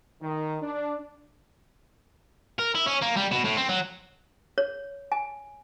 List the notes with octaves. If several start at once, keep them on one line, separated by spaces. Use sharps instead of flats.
D#3
D4
A#4
E4
C#4
A#3
G3
B2
A2
C4
F#3
C#5
G#5